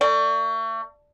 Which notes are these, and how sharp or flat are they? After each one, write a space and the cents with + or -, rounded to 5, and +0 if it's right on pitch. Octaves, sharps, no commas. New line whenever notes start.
A3 +40 D5 +0